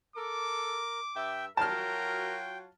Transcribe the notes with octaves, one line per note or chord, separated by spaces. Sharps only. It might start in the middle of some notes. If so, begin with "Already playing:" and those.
A4 A#4 D6
G2 E5 G5
F#3 F4 F#4 A#4 G5 A5 F6